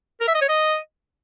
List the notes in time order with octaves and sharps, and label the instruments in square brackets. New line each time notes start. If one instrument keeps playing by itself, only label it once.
[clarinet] A#4
E5
D#5
C#5
D#5